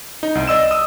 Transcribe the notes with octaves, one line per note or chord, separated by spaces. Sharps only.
D#4
C2
D5 D#5 E6 E7
D#6 E6